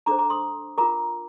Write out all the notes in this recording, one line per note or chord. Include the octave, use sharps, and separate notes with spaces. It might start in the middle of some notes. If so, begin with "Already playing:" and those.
D4 A4 C5 A#5 D6
A#5 D6
C6 D#6
F4 A#4 A#5 D6